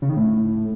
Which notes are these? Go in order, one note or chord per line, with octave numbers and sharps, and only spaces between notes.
C#3
D#3
A2